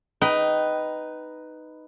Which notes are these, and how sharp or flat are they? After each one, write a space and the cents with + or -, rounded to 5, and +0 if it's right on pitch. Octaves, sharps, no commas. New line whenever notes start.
D#4 +0 B4 +5 G5 -25